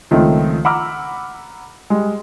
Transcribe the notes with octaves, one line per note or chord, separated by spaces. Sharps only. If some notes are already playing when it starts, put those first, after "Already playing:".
C#2 D#3 F3 A3 C4
F#5 A#5 B5 D6 E6 F6
G3 G#3